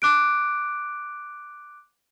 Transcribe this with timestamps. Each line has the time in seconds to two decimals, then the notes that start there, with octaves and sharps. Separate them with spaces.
0.02 D6 F#6 D7